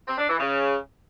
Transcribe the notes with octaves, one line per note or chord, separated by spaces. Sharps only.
C4
D4
E3
C#3